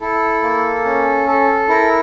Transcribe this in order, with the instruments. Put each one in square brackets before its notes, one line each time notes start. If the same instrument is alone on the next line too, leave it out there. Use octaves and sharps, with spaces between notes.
[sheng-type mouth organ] E4 A4
A#3
C#4
A4
E4 A#4